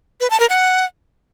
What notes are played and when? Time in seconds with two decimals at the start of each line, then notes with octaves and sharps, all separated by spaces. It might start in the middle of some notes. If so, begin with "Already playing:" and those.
0.21 B4
0.30 A5
0.40 A#4
0.50 F#5